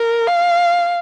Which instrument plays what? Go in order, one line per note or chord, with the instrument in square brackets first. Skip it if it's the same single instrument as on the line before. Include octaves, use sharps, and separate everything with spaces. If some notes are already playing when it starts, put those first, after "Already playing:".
Already playing: [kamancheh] A#4
F5